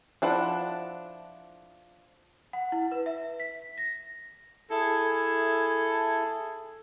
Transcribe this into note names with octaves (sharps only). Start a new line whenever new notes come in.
F3 D4 E4 F#5
F#5
E4
B4
E5
B6
A#6
E4 G#4 A4